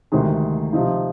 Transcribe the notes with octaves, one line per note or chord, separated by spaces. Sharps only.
D2 C3 D#3 G#3
C3 F3 C4 D#4